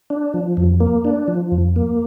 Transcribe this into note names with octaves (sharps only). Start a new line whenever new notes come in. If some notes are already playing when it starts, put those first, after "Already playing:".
D4
F3
F2
A#3
D4
F3
F2
A#3